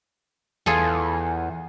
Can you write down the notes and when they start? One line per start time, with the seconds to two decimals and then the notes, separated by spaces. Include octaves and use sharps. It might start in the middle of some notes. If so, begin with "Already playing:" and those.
0.66 E2 F4 G#4 A4